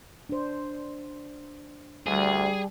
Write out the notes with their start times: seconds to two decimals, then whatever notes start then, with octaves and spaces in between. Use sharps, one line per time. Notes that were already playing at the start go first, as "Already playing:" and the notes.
0.29 D4 C5
2.07 D2 G3 G#4